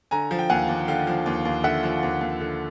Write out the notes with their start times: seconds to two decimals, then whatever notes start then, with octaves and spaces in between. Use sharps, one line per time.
0.11 D3 G#5 A#5
0.31 F3
0.39 G5
0.50 D#2 F#5 G#5
0.68 D#2
0.88 D3 F5 G5
1.07 F3
1.26 D#2
1.45 D#2
1.63 D3 E5 F#5
1.83 F3
2.03 D#2
2.21 D#2
2.40 D3